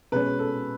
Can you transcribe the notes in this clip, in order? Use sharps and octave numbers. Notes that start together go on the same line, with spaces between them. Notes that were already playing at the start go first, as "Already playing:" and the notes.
B2 G#3 C#4 B4
A4